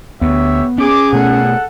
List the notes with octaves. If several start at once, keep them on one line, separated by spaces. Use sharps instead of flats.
D2 B3 G4 C#5 E5
C#4 G#4 D6
B2 A3 A4 F#5